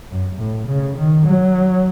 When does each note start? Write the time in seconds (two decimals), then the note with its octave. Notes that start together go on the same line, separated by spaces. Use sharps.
0.10 F#2
0.39 A2
0.67 C#3
0.97 D#3
1.26 F#3